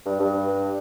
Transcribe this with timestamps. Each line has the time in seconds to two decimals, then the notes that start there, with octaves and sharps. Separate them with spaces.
0.06 G2
0.20 G2